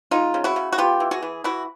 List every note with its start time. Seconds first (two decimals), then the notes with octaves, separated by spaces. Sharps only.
0.11 G#3 D#4 F4
0.34 C#3
0.44 E4 F#4
0.56 C#3
0.73 F#4
0.78 B3 F4 G4
1.00 E3
1.11 F#4 G#4
1.23 E3
1.44 E3 E4 F#4